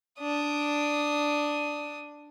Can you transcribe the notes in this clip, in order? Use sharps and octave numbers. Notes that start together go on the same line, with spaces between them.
D4 D#6